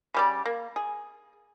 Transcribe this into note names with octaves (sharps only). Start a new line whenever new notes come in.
C#3 G3 D5
A#3
G#4